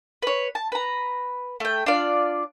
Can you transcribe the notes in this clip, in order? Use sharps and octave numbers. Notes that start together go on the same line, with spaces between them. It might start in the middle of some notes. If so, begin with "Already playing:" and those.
B4 C#5
A5
B4 A#5
A3 G5
D4 F4 D5